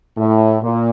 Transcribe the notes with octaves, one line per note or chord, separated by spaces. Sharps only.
A2
A#2